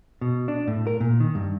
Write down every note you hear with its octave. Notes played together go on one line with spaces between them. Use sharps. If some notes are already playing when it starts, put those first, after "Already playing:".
B2
D4
A2
A#4
A#2
D#3
G2